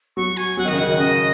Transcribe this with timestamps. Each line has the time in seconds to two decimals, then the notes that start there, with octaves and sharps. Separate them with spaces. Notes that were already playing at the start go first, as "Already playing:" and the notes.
0.17 F#3 C#6
0.37 G#5
0.57 F#3 F#5
0.65 D#3
0.68 C#3 D#5
0.78 D#3 F#5
0.92 D#3
0.99 C#3 D#5